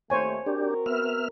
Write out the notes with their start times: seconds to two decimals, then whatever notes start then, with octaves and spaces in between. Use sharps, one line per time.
0.10 D#2 A3 C5 C#5 G#5
0.46 C4 D4 F#4 G4 A#4
0.86 B3 E5 F6